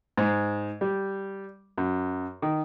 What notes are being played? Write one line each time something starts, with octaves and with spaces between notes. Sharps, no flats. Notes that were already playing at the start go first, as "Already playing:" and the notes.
G#2
G3
F#2
D#3